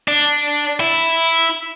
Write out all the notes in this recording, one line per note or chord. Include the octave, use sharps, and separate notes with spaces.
D4
E4